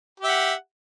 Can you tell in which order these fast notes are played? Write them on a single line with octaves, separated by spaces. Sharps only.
G4 E5 F#5